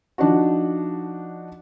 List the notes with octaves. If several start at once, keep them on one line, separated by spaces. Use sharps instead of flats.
F3 D4 D#4 F#4